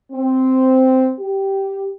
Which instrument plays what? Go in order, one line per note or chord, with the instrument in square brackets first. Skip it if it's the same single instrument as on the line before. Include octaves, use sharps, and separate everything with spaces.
[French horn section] C4
G4